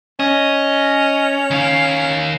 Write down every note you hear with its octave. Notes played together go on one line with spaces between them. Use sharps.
C#4 D#5
D#3 F5